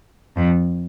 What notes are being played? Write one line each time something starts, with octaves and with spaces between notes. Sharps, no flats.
F2